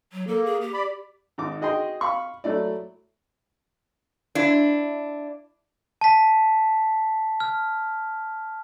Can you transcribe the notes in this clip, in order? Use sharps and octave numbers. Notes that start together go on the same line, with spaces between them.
F#3
A#3 A4
G#4
G4
D5 B5
G#1 D#4 D6
F#4 G#4 D#5 G5 C6
F5 B5 C#6
F#3 A3 E4 D5
D4 E4
A5 B6
F6